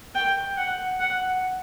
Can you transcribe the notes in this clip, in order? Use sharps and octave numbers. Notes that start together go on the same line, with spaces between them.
G5
F#5
F#5